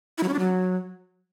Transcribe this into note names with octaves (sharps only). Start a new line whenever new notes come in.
E4
F#3
C#4
D4
F#3